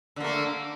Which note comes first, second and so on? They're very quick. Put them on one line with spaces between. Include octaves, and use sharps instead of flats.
D3 A#3 A3